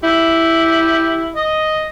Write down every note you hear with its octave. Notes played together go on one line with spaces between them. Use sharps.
E4 G4
D#5